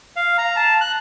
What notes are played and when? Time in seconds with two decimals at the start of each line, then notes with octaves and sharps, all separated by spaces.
0.16 F5
0.38 A#5
0.56 A5
0.81 F#6